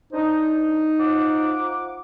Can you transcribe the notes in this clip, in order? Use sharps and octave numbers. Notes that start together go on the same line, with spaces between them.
D4 D#4 C5 D#5
F3 F#5 D6